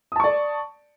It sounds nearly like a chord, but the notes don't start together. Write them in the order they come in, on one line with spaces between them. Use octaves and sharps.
D#6 A5 C#6 D5